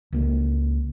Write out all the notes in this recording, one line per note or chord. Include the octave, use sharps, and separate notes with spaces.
C#2 A#3